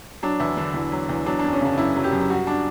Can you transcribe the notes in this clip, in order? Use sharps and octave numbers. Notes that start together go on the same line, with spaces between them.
F#3 D4
E2 E4
D3 D4
E2
F#3
E2
F#3 D4
F#2 D4
C#4
C#3 D4
F#2 E4
F#3
G4
F#2
G3 F#4
D4